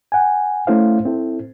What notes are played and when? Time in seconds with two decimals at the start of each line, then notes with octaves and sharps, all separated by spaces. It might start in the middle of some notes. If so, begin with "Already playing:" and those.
0.12 F#5 G#5
0.67 A3 C#4 E4 C5 F5
1.05 C4 E4 A4